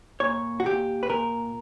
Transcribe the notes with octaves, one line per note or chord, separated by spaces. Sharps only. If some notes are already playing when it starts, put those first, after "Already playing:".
A#2 C#5
F#4
A#2 G4
B4
A#2 A#4